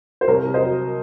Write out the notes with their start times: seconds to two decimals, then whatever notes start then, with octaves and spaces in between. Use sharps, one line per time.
0.21 C5
0.27 C2 A#4 C#5
0.44 C2
0.54 C5 D#5
0.63 F#3